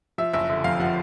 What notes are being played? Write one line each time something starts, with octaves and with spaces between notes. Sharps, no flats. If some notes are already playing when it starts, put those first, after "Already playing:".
F3 E5
F#1 E5
D3 E5
F2 F5
F3 F#5